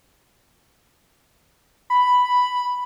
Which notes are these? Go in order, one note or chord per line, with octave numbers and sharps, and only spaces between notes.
B5